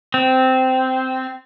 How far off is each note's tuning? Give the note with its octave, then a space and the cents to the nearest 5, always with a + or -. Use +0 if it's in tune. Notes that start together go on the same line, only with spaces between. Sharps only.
C4 -10